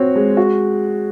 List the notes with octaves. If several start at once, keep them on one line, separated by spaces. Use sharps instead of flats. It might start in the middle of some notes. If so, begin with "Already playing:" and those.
Already playing: C4 F#4 C#5
G#3
F#4